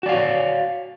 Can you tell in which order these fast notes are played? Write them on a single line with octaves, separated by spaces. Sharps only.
F#4 D5 F5 C#5